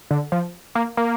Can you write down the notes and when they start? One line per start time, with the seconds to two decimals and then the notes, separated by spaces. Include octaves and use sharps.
0.11 D3
0.32 F3
0.75 A#3
0.97 A#3